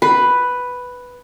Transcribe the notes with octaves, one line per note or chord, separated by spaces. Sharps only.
B4